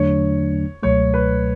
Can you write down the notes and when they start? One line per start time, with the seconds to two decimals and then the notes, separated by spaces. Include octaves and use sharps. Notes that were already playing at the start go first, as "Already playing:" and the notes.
Already playing: E2 D3 F#3 A3 D4 C#5
0.83 C#2 B2 F#3 A3 C#5
1.14 B4